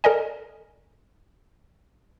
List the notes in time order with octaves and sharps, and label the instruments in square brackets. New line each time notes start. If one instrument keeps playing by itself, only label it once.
[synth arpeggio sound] A4 A#4 D5 D#5 G#5